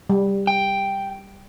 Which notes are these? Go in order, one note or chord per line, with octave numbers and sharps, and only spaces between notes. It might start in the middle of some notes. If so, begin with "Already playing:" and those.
G3
G5